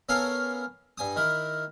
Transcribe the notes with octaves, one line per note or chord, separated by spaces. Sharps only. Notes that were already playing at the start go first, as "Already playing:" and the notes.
B3 C#4 A4 A#4 F5 G#5
G2 G#5 D#6
D#3 E4 A#4